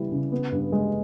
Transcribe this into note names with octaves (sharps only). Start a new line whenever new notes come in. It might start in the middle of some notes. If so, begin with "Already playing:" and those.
Already playing: C#3 G3 B3 E4
C#3
B3
G2
G#3